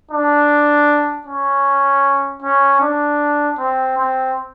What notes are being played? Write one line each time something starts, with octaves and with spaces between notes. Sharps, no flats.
D4
C#4
C#4
D4
C4
C4